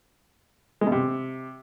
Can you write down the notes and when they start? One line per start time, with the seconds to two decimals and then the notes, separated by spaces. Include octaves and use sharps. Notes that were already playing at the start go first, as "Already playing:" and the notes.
0.81 G#3
0.87 B2
0.92 C3